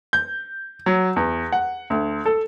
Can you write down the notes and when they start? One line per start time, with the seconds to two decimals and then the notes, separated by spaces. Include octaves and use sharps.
0.13 G6
0.86 F#3
1.16 E2
1.52 F#5
1.90 D2
2.26 A4